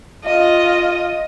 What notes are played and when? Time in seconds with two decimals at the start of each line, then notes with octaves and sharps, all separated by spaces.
0.25 F4 D#5